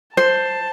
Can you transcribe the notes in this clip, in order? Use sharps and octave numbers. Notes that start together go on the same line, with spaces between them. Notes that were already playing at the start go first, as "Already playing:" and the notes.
C5 A5